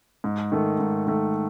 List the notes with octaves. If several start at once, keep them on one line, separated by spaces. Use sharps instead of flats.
G#2
D#3 A3
G#2
D#3 A3